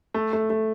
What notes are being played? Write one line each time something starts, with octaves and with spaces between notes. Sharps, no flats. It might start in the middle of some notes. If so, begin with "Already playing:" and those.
A3
A3
A3